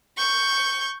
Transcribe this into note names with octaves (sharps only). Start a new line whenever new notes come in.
C#6 G6